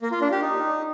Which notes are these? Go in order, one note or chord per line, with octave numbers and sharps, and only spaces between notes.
A#3
F4
D4
G4
D#4